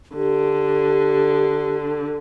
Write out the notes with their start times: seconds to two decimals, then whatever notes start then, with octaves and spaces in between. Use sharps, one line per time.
0.15 D3 G4